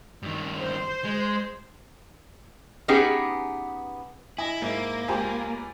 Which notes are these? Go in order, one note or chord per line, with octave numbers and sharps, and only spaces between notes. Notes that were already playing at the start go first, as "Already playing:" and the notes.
G2 D#3
C5
G#3
B3 C#4 D#4 G4 G#4 B4
E4 D#5 G#5
G#2 A#3 E4
C#2 G4 C5 G#5 A#5